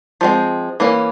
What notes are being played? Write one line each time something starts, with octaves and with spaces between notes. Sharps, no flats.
F3 G#3 C4
E3 A#3 C#4